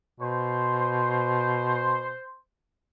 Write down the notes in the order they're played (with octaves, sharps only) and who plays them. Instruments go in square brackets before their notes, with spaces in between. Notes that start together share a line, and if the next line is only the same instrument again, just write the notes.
[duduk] B2 [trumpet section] C5